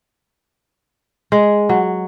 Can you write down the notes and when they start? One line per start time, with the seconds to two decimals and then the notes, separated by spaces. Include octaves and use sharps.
1.32 G#3
1.69 F#3